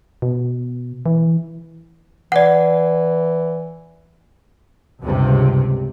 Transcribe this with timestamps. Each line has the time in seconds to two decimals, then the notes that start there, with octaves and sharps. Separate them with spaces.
0.22 B2
1.06 E3
2.32 E3 D5 F#5
5.03 C#2 G2 C3